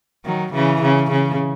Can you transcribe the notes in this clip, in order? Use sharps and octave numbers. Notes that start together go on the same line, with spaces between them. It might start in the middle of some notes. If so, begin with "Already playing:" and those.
D#3 F#3
C#3 E3
C#3
C#3